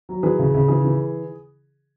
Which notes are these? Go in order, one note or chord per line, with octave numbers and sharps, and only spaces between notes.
F#3
E3 G#4 B4
C#3
C#3
E3 G#4
E3